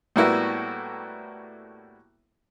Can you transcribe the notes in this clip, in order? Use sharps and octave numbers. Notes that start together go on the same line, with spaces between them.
A2 G3 A#3 B3 E4 F#4